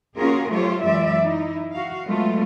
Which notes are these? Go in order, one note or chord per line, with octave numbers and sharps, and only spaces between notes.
A#3 C#4 F4 F#4 G#4 A#4
F#3 A3 F4 G4 C5 C#5
F#2 E3 G#3 F4 D5 E5
D#4 E4
F#4 F5
F#3 G#3 A3 B3 F4